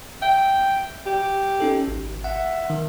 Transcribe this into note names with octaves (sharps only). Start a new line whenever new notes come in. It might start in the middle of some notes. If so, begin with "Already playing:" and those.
E5 G5
G4
C#4 D#4 A4
G#1
E5 F#5
D#3